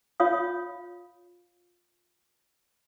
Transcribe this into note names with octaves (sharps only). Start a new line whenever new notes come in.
F4 C#5 F5 D#6